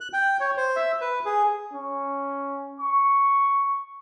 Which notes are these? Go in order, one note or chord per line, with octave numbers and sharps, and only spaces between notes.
F#6
G5
C#5
C5
E5
B4
G#4
C#4
C#6